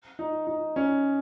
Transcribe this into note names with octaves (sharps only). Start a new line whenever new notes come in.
D#4
D#4
C#4